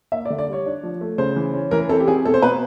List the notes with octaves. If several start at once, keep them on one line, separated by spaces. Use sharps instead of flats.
A#3 E5
D5
D3
D5
G3 C#5
D4
F3
A3
C#3 C5
E3
C#4
E3 A#4
C4 A4
G4
C4 G#4
B2 A4
C5
B2 B4